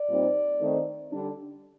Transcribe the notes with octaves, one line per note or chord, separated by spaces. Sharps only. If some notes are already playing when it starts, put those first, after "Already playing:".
Already playing: D5
A#2 G3 C4 D#4
D#3 A3 C4 D#4
D3 G3 D4